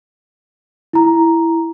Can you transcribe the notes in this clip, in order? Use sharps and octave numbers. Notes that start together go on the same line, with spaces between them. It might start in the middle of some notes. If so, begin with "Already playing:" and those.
E4 A#5